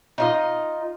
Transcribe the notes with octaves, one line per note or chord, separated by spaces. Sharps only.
D#4 F4 D#5